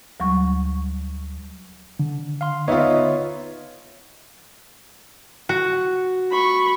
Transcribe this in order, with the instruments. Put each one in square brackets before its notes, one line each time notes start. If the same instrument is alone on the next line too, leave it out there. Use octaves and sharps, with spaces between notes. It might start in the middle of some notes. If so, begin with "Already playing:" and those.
[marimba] D2 F#3 G3 C#6
[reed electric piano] D3
[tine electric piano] F5 C6
[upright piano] B3 F4 [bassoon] D#4 [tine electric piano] C#5 E5
[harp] F#4
[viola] B5 C#6